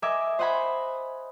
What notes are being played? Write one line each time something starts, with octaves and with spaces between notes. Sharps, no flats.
A#4 D#5 E5 G#5 D6
C5 D#5 F#5 G#5 B5